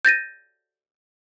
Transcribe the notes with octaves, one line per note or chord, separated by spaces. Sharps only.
G6 A6 A#6 D#7